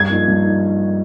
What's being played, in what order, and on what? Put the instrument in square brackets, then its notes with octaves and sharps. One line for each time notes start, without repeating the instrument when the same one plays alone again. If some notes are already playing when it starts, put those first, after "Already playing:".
Already playing: [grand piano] G2 [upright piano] G#6
[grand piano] F3 A#3 D#4
G2
D#4